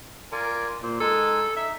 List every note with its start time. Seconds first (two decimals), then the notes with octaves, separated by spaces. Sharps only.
0.32 F4 A#4 D5 G#5
0.83 A#2 A#3 C5
1.00 G#3 D#4 A4 G#5
1.57 D#4 E5